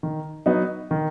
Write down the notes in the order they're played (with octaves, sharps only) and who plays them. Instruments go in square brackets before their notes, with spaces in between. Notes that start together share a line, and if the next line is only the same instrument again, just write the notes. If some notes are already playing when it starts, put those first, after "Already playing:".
[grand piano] D#3
F#3 B3 D#4
D#3